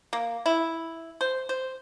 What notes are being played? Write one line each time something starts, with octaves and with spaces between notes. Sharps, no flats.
A#3
E4
C5
C5